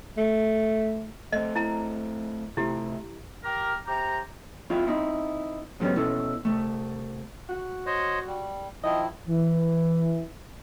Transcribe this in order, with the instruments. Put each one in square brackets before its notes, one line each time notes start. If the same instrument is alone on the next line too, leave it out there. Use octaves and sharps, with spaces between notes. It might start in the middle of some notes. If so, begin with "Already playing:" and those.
[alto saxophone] A3
[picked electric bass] A3 C4 [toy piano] D#5
[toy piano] E4 A#5
[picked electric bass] C3 A3 [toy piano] E4 G4
[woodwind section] G4 A#4
C3 G4 C5 G5 A#5
[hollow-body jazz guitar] C4 E4 F4 G#4
C4 D#4 E4
G#2 D3 F#3 G3 B3 C#4
B2 C#4 E4 A4
C2 A3
[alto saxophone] F#4
[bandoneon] C5 C#5 D#5
G3
[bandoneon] D#3 F3 E4 [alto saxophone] D#5
[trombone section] E3